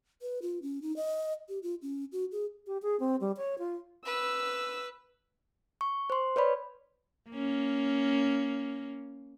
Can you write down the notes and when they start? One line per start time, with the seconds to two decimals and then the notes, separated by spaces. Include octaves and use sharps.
0.22 B4
0.42 F4
0.62 C#4
0.82 D#4
0.96 D#5
1.49 G4
1.63 F4
1.82 C#4
2.12 F#4
2.32 G#4
2.67 G4
2.82 G#4
3.00 C4
3.21 G3
3.37 C#5
3.59 F4
4.06 B4 E6
5.81 C#6
6.10 C5 C6
6.36 B4 C#5 D5 B5
7.30 A#3 C#4